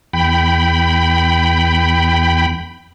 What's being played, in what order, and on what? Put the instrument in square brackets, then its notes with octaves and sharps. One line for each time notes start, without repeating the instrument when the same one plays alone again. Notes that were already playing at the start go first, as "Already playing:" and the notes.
[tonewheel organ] E2 G5 B5